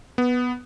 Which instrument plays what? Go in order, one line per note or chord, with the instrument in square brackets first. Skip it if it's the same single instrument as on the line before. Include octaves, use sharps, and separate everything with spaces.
[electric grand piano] B3